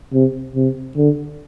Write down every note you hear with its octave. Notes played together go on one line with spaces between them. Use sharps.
C3
C3
D3